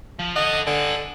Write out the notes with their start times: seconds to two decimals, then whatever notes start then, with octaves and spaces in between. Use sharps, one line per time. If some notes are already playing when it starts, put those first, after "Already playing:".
0.19 F3
0.36 A4 D#5 F#5
0.67 D3 A4 G#5